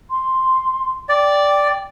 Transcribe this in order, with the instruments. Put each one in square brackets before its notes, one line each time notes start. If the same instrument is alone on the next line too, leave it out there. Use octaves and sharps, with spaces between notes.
[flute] C6
[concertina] D5 [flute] G5